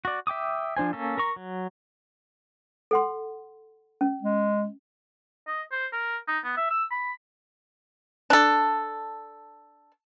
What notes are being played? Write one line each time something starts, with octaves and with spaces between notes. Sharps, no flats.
F#4 D5
E5 G5 D6 D#6
F3 D4 C5 G#5
A#3 C#4 A4
A#4 A#5 C#6
F#3
A4 F#5 C6
C#4
G#3
D#5
C5
A#4
D#4
B3
E5
E6
B5
D4 A4